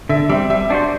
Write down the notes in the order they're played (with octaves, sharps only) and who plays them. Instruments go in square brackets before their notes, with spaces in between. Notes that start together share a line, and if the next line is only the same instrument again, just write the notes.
[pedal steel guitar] D3 [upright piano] E5
[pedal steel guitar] G3 C4 [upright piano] E5
[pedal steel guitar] G3 [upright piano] E5
[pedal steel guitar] D4 F#4 C5 [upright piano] D5